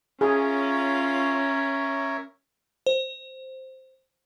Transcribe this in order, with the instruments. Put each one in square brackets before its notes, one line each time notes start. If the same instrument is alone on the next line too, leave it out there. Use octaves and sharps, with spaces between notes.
[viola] C#4 [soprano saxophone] F4 [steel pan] G#4 [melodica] A#4 C#5 E5
[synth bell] C5